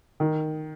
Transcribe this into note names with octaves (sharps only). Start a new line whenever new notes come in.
D#3